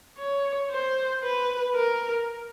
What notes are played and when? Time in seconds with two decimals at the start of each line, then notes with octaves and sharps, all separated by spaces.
0.18 C#5
0.70 C5
1.23 B4
1.75 A#4